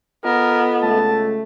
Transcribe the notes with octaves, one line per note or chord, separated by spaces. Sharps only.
B3 F4 A4 A#4 D#5
C#2 A3 A5